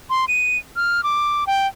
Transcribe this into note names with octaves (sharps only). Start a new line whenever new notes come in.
C6
D#7
F6
D6
G5